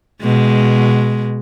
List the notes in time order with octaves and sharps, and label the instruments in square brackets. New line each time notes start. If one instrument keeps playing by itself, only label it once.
[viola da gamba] B2 G#3